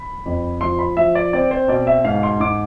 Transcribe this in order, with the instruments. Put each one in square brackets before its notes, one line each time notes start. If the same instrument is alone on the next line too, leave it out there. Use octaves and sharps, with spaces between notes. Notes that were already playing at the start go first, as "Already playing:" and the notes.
Already playing: [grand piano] B5
F2
F3 C6
B5
F3 E5
D5
C4 D5
C5
B2 D5
E5
G#2 F5
C6
G#2 D6